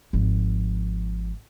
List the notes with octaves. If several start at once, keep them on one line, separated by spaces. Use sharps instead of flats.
G#1 F3